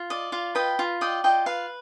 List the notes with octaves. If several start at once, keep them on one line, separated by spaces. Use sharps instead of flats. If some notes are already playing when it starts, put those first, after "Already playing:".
Already playing: F4
D5 D#5
F4 F5
B4 D#5 G5
F4
D5 D#5 G5
F4 D#5 G5
B4 F5